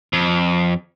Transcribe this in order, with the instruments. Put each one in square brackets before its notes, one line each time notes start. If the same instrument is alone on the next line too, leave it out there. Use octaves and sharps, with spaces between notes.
[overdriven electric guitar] F2